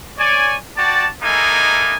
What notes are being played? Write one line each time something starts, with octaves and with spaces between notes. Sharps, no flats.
C#5 D5 G#5
F#4 D5 G5 A5
G#3 A#3 D#4 E4 A4 G#5